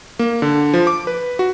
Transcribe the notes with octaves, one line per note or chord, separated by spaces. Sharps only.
A#3
D3
F3
D6
B4
F#4